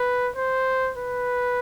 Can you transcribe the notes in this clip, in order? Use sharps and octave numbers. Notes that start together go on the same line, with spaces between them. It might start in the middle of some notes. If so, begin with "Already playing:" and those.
Already playing: B4
C5
B4